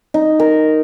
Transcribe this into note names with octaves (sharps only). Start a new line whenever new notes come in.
D#4
A#4